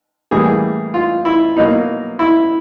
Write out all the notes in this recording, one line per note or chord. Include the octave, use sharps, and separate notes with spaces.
A2 E3 G3 A#3 G#4
F4
E4
B2 F#3 A#3 D#4
E4